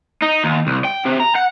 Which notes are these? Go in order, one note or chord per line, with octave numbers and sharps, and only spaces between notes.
D#4
D#2
C2
G5
C3
A#5
F#5